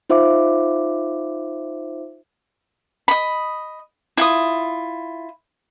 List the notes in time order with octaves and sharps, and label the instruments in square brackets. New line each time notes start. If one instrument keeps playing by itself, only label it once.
[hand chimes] D#4 F4 C5 E5 F5 D6
[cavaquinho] D#5 B5
E4 F4 D#6